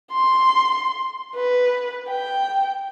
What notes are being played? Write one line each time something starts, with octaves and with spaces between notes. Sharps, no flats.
C6
B4
G5